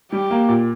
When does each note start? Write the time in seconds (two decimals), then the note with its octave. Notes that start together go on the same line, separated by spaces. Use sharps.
0.12 G3 G4
0.31 A#3
0.48 A#2